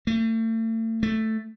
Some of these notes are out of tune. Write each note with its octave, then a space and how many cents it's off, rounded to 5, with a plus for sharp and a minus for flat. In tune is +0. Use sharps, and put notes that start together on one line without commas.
A3 +40
A3 +5